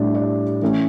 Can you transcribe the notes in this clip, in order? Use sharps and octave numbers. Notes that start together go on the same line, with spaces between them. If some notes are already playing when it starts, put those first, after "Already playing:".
Already playing: A2 G3 D4 D5
D5
E3 A3 C#4